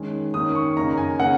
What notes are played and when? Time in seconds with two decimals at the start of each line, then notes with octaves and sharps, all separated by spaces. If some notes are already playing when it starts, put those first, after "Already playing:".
Already playing: D#3 G#3 C#4
0.34 D#3 A#3 C#4 D#6
0.55 C#6
0.77 F#2 C#3 A#3 D#4 A#5
0.91 A#5
0.98 G#5
1.20 C#3 A#3 F#5